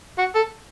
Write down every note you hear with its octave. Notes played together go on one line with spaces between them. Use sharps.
F#4
A4